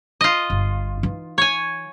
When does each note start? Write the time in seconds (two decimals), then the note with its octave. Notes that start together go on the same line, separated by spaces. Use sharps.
0.21 F4 D#5
0.50 G1
1.03 E3 D#4
1.38 C#5 G#5